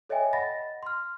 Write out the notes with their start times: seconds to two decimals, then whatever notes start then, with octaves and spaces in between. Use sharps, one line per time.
0.09 A4 C#5 D#5 E5 G5 G#5
0.33 D#5 F#5 B5 A6 A#6
0.83 C6 F6